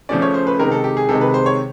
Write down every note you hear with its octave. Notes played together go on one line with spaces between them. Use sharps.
C#3 F3 A3 C#4 D5
C#5
C5
B4
C3 D#3 G#3 A#4
A4
G4
G#4
C3 D#3 G#3 A4
B4
C5
C#5